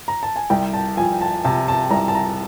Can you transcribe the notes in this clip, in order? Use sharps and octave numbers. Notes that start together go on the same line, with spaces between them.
A#5
A5
G#5
C2 G5
A5
F3 G#5
A5
C3 A5
A5
C2 A#5
A5
A#5